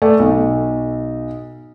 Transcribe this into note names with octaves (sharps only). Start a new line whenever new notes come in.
A3 D5
B1